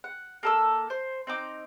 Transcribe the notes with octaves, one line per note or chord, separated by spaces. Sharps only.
F#5
A#3 A4 E6
C5
C4 D#4 D6